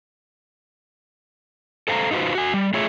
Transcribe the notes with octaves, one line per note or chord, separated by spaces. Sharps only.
A4 C5 F5 G#5 A#5
D#4 F4 F#4 B4 C5
F#4 G#5
G3
A3 F4 G#4 C#5 E5